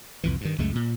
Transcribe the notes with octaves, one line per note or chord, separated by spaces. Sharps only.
C2 F2 E3
G2 D#3
C#2 F#2 G#3 A3
A#2